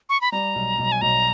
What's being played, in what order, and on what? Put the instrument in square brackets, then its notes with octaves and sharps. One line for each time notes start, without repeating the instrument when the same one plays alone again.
[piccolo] C#6
B5
[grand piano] G3 [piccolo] A#5
[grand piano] B1
B1
[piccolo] G#5
[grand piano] B1 [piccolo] A#5